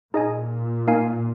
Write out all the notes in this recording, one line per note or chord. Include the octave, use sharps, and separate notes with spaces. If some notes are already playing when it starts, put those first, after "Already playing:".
A#2 D#4 G#4 D#5 G#5
A#3 D#4 A#4 F5 G#5